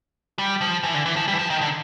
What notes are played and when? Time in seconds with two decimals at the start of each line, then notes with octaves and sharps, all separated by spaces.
0.39 G3
0.61 F3
0.83 E3
0.94 D3
1.06 E3
1.16 F3
1.28 G3
1.33 E3
1.39 F3
1.50 D#3
1.61 D3